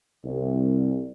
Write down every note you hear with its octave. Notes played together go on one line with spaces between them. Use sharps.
C2